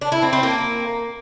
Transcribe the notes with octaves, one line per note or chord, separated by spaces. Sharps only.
D4
E4
C4
C4
A#3